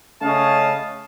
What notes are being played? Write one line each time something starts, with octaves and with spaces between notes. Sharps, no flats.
C#3 A3 C#4 D#5 F5 A5